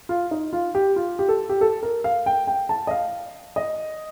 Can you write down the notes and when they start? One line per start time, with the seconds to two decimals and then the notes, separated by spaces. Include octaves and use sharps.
0.09 F4
0.31 D#4
0.53 F4
0.75 G4
0.96 F4
1.19 G4
1.28 A4
1.50 G4
1.61 A4
1.83 A#4
2.04 F5
2.26 G5
2.47 G5
2.69 A5
2.87 D#5
2.91 F5
3.56 D#5